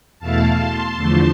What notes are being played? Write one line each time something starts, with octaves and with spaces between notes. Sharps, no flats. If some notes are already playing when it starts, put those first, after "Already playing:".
E2 B2 A3 E4 F5 A5
A5 C6
E2 D3 F3 A3